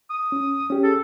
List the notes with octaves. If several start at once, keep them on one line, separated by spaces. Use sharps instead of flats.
D#6
C#4
C#4 G4 G#4
A4